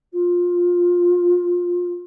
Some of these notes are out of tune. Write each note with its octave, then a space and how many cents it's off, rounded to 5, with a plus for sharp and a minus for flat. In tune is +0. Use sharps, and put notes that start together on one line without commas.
F4 +15